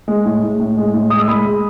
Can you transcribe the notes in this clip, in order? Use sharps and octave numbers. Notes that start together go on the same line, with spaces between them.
G#3
A2
A2
A2
G#3
A2
G#3 D#6
E6
G#3 B5 D#6
G#3